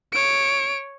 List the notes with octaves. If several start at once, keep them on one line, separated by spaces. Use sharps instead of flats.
C#5 D7